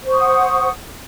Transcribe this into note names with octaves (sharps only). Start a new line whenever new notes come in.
C5 F#5 C#6 D#6